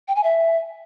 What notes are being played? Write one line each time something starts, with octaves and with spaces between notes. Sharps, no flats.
G5
G#5
E5